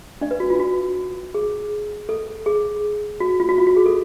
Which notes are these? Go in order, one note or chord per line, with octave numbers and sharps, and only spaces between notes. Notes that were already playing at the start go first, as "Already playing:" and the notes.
D4 D5
B4
F#4
F4
F#4
G#4
A4
G#4
F#4
F4
F#4
F4
F#4
G#4
A4